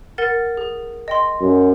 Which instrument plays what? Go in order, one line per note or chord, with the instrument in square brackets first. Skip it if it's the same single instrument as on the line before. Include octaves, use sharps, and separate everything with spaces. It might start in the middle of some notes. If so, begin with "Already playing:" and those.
[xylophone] A#4 F#5 A6
G#4
D#5 G5 C6
[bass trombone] F#2